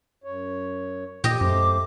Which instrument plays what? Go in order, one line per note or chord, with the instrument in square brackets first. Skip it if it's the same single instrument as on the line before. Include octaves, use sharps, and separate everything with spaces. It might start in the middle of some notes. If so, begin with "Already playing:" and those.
[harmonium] F#2 C#5
[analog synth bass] A#2 [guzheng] G4 D#5
[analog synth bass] F#2 [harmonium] A3 C5 [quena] D6